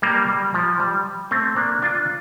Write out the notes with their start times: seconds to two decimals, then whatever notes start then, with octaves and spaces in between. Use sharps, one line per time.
0.02 G3 A#3
0.29 G3
0.54 F3
0.80 G3
1.31 A3 C4
1.56 A#3 D4
1.82 D4 F4